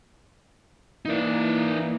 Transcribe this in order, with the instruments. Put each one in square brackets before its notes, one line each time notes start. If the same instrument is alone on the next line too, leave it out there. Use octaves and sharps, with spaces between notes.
[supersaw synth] E3 A#3 [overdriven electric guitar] D#4 D5